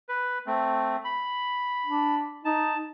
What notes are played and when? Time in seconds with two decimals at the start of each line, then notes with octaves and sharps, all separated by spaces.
0.09 B4
0.47 A3 C4
1.04 B5
1.86 D4
2.45 D#4 A5